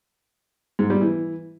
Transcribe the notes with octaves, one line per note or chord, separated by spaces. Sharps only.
G#2
G3
E3